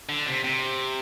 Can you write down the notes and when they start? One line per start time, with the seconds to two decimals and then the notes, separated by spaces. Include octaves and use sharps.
0.09 D3
0.27 C3
0.44 C3